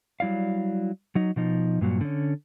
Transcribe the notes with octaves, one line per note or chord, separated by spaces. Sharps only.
F#3 G3 E4 D5 F5
F#3 D#4
B2 F3 D#4
G2 A#2 F#3
D3 C#4